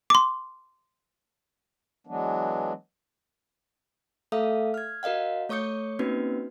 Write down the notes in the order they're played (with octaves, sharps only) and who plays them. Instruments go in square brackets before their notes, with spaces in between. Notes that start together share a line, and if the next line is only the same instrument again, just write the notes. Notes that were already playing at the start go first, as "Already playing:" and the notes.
[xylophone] C6 D6
[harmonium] E3 F#3 G#3 B3 D4
[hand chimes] A3 A4 E5 F5 D#6
F6 G#6
F#4 A#4 D#5 F5 F#5
A3 C#5 C#6 D#6 G6 C#7
A#3 C4 C#4 D#4 F#4 B4